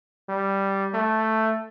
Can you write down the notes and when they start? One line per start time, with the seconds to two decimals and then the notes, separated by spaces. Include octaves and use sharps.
0.29 G3
0.94 A3